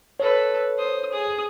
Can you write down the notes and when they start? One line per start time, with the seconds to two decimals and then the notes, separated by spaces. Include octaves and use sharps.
0.20 A4 B4 C#5
0.78 C5 D#6
1.13 G#4 D#6